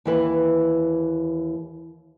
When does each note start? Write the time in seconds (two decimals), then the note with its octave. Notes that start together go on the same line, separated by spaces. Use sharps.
0.05 D#2 E3 B4